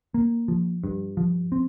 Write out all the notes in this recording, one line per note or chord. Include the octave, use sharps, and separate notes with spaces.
A#3
F3
G2
F3
C4